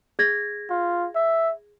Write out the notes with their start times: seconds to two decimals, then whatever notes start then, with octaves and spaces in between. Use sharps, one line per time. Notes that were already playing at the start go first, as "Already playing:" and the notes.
0.19 G#4 G#6 A#6
0.70 F4
1.15 E5